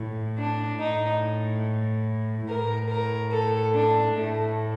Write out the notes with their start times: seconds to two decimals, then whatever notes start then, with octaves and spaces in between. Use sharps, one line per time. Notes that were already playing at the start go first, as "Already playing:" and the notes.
Already playing: A2
0.38 D4
0.80 A2 D#4
2.48 A2 A#4
2.89 A#4
3.32 A4
3.74 D4
4.16 A2 A3